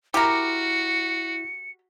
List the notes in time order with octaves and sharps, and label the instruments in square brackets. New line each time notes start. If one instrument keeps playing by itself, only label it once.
[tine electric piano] E4 [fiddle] F#4 [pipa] G4 A#4 [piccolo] C#7